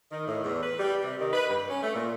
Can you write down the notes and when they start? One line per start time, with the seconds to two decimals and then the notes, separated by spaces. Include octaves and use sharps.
0.12 D#3
0.27 A2
0.44 E2
0.62 B4
0.79 G3
1.02 C3
1.20 D#3
1.33 B4
1.49 G2
1.70 C#4
1.83 A3
1.95 A#2